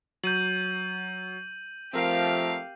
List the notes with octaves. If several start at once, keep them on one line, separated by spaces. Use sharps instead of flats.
F#3 G6 D#7 F#7
F3 A3 C4 G4 A#4 F5